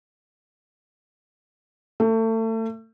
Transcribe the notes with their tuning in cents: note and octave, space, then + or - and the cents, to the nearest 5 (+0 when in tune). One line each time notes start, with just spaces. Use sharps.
A3 +30